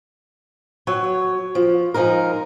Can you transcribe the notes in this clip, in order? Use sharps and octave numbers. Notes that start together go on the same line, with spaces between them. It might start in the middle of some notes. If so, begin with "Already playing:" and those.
F#3 C#5
F3
F3 G#3 D#4 A#4